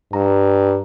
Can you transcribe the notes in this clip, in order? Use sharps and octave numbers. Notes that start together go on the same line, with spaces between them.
G2 A#5